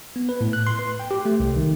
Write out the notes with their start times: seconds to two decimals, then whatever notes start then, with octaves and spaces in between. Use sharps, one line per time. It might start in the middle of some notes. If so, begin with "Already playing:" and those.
0.16 B3
0.29 B4
0.41 A2
0.53 F#6
0.67 C6
0.79 B4
1.00 G5
1.11 G4
1.25 A3
1.40 C2
1.57 D#3